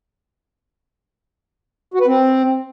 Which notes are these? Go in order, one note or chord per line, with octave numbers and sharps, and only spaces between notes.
F#4
B4
C4